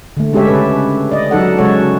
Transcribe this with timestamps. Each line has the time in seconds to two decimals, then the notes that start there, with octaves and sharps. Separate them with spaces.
0.17 D3 A3
0.33 G#3 C#4 G4 A4 C#5 E5
0.47 C#3 C#4 A4 B4
1.12 D5 D#5
1.31 F#3 D#4 A4 F#5
1.58 C#3 G#3 F#4 A4 C#5